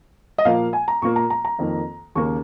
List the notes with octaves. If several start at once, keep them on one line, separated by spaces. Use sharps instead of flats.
D#5
A#2 F3 A#3 F5
G#5
A#5
A#2 A#3 C#6
A#5
A#5
A#5
F2 D#3 A#3
D#2 C#3 A#3 C#6